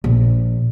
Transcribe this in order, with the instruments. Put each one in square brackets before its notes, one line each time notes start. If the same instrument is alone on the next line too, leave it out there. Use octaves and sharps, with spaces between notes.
[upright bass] A#1